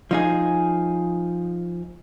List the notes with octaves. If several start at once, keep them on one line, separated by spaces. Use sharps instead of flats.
F3 D#4 G#4